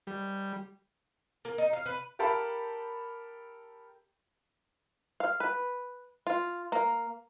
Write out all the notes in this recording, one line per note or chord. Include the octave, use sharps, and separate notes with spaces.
G3
A#3
D#4
F5
B4
G4 A4 A#4 F5 A5 B5
F5
B4
F4
A#3